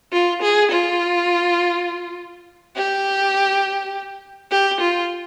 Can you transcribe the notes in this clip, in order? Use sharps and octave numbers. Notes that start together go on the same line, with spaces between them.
F4
G#4
F4
G4
G4
F4